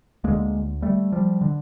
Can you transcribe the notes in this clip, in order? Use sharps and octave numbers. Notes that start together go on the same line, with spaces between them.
D2 D3 G#3 A#3
G3 A3
F3 G3
D3